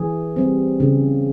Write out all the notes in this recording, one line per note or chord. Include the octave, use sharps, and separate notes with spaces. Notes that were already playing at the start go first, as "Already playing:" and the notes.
Already playing: E3 G#4
G3 C4
C#3